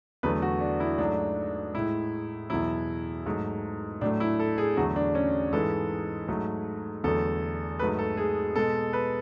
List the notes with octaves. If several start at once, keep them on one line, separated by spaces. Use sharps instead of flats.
E2 D3 F#3 A3 B4
F#4
D4
E4
G#2 F#3 A3 D4
A2 G#3 E4
E2 B2 F#3 E4
G#2 F#3 A3
A2 F#3 A3 D4
E4
A4
G#4
E2 D3 F#3 A3 F#4
D4
C#4
G#2 E3 G#3 A4
G#2 F#3 A3
E2 D3 F#3 A3 A4
G#2 F#3 A3 B4
A4
G#4
B2 G#3 A4
B4